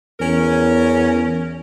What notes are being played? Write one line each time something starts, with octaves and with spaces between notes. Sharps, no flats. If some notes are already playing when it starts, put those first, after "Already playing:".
E2 C#4 A#4